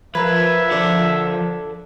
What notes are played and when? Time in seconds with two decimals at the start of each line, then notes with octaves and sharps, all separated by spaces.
0.15 F3 A#4 B4 E5 A#5 G#6
0.71 A4 D5